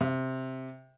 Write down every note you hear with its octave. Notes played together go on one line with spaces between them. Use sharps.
C3